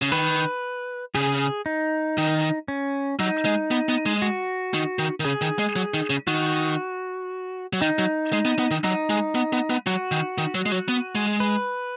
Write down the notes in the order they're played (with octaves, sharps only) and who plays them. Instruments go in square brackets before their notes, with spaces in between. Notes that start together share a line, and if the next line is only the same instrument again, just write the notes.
[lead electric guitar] C#3
[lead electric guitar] D#3 [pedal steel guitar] B4
[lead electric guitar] C#3 [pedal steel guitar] G#4
[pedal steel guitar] D#4
[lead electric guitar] D#3
[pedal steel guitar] C#4
[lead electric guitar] F#3 [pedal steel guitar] D#4
[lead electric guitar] G#3
B3
B3
G#3
[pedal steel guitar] F#4
[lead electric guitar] D#3
D#3
D#3
[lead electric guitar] C#3 [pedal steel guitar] G#4
[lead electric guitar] D#3
G#3
F#3
D#3
C#3
[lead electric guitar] D#3 [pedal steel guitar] F#4
[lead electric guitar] F#3
[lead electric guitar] D#3 [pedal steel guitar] D#4
[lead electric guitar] F#3
G#3
B3
B3
D#3
[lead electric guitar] F#3 [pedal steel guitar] D#4
[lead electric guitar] G#3
B3
B3
B3
[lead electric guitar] F#3 [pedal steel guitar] F#4
[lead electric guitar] D#3
D#3
F#3
G#3
F#3
B3
G#3
[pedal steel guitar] B4